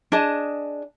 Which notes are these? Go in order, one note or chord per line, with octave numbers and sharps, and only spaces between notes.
D4 G#4 D#5 A5